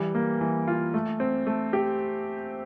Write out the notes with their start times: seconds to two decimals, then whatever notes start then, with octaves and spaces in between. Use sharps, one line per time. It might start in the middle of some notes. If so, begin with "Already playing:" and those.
Already playing: E3 G3
0.15 A#3
0.41 E3
0.68 F4
0.94 A3
1.20 C4
1.47 A3
1.73 G4